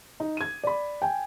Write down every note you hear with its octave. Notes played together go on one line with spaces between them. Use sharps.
D#4
G#6 D#7
D5 B5
G5 G#5